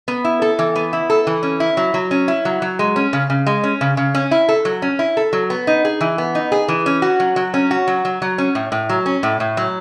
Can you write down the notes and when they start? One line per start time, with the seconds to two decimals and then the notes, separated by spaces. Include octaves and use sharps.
0.08 B3
0.24 E4
0.42 A4
0.59 E3
0.76 B3
0.93 E4
1.10 A4
1.27 E3
1.43 C#4
1.60 E4
1.77 F#3
1.94 F#3
2.11 C#4
2.28 E4
2.45 F#3
2.62 F#3
2.79 G#3
2.96 C#4
3.13 C#3
3.30 C#3
3.46 G#3
3.63 C#4
3.81 C#3
3.97 C#3
4.14 C#4
4.31 E4
4.49 A4
4.65 F#3
4.82 C#4
4.99 E4
5.17 A4
5.33 F#3
5.50 B3
5.67 D#4
5.85 G#4
6.01 E3
6.18 B3
6.35 D#4
6.52 G#4
6.68 E3
6.86 C#4
7.02 F#4
7.20 F#3
7.36 F#3
7.54 C#4
7.71 F#4
7.87 F#3
8.05 F#3
8.22 F#3
8.38 C#4
8.55 A2
8.72 A2
8.89 F#3
9.06 C#4
9.23 A2
9.40 A2
9.57 F#3